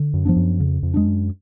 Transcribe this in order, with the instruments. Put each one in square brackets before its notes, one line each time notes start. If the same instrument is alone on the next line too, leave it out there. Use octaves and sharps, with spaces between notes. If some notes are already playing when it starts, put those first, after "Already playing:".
Already playing: [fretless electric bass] D3
[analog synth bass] F#2
[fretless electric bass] F3 B3 D4
[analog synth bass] F#2
[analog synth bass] F2 [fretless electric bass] C#3
[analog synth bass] F2
[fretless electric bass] G#3 B3 D4
[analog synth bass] F#2